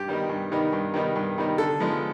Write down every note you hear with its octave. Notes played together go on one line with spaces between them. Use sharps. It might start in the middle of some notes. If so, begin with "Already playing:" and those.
Already playing: G2 G4
D#3 G3 B3 D#4
G2
D#3 G3 B3 D#4
G2
D#3 G3 B3 D#4
G2
D#3 G3 B3 D#4
D3 A4
F3 G#3 B3 D#4